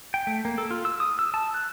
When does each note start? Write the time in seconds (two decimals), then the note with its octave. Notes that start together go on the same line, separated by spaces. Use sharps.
0.14 G5
0.27 A3
0.45 A#3
0.58 A4
0.71 F4
0.85 E6
1.00 D#6
1.19 E6
1.34 A5
1.54 F#6